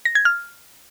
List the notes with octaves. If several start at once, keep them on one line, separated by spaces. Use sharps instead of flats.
A#6
G#6
F6